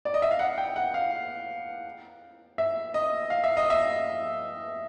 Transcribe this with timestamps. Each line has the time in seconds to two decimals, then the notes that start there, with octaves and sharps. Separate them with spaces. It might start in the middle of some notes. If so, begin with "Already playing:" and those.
0.05 D5
0.14 D#5
0.22 E5
0.31 F5
0.39 F#5
0.58 G5
0.76 F#5
0.94 F5
2.58 E5
2.94 D#5
3.30 F5
3.44 E5
3.57 D#5
3.70 E5